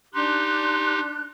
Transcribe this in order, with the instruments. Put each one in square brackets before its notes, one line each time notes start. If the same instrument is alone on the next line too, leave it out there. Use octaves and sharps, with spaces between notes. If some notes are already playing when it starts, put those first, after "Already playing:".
[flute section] D4 F#6 [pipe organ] D#4 G4 [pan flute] C6